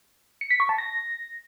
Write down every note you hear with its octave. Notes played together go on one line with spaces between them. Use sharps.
C#7
B6
C#6
A5
A#6